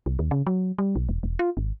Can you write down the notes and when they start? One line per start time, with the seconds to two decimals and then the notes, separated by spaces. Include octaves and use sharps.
0.06 C2
0.19 D#2
0.31 C#3
0.47 F#3
0.78 G3
0.96 B1
1.09 E1
1.23 E1
1.39 F4
1.57 G#1